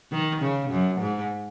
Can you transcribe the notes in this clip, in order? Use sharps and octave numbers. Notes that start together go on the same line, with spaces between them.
D#3
C#3
F#2
G#2